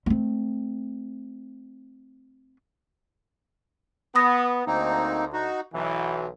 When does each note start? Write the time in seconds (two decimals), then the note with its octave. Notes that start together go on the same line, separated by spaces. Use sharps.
0.06 A3 C4
4.15 B3 B5 D#6 A#6
4.67 D2 A#3 C4 D#4
5.33 D#4 F#4
5.73 B1 E3 F#3